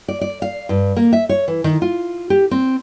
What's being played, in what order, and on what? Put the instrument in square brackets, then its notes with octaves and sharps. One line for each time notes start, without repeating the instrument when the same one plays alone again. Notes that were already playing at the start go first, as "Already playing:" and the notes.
[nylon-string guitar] D5
D5
F5
G2
A#3
E5
C#5
E3
D#3
F4
G4
C4